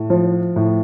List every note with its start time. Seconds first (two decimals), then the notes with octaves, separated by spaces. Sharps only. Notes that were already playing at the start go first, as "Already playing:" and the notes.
Already playing: A2
0.10 F3
0.56 A2